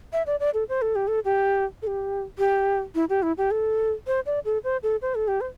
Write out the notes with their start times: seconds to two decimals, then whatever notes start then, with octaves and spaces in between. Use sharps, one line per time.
0.13 E5
0.27 D5
0.40 D5
0.54 A4
0.69 C5
0.82 A4
0.96 G4
1.08 A4
1.25 G4
1.82 A4
1.87 G4
2.38 G4
2.95 E4
3.09 G4
3.22 E4
3.38 G4
3.51 A4
4.07 C5
4.26 D5
4.45 A4
4.64 C5
4.83 A4
5.02 C5
5.15 A4
5.28 G4
5.41 C5